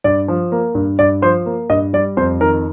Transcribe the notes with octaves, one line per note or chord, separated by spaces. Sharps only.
G2 D5
F3
A#3
G2
G2 D5
F3 C5
A#3
G2 D#5
G3 D5
F2 C5
D#3 A#4